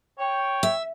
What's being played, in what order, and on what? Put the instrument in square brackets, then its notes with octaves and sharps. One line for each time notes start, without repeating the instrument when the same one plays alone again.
[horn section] C#5 G5
[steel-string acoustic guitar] E5